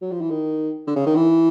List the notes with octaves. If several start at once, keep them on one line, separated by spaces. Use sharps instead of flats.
F#3
F3
E3
D#3
D3
C#3
D#3
E3